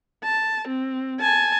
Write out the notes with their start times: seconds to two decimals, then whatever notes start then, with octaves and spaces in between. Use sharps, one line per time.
0.23 A5
0.68 C4
1.20 G#5 A5